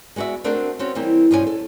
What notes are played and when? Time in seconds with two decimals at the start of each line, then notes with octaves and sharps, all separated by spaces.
0.16 G#3 B3 F#4 D5 E5
0.44 A3 C4 D4 F#4 A4 A#4
0.79 C4 C#4 F#4
0.95 E3 G3 A#3 C4
1.31 G2 B2 F3 C#4 G#4 G#5
1.47 A4